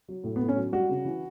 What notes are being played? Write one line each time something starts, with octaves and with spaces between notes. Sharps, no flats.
F#3
A2
B3
A2
C#4
F#3
G3 F#4
C#3
E3